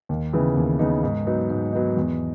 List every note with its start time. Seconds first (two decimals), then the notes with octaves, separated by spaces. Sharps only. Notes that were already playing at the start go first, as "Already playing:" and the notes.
0.09 D#2
0.33 C#3 E3 B3 D#4
0.57 D#2
0.79 C#3 E3 B3 D#4
1.04 G#2
1.27 F#3 B3 D#4
1.50 G#2
1.73 F#3 B3 D#4
1.97 E2